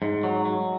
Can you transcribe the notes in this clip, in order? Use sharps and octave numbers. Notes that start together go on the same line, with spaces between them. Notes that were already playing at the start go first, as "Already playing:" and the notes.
G#2
F#3
F#3